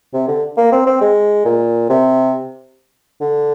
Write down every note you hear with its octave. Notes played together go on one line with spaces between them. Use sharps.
C3
D3
A#3
C4
C4
G#3
A#2
C3
D3